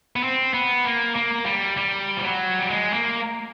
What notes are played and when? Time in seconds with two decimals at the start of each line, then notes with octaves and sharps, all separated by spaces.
0.16 B3
0.24 C4
0.54 B3
0.85 A#3
1.16 A#3
1.46 G3
1.77 G3
2.17 F3
2.23 F#3
2.59 G3
2.70 G#3
2.93 A#3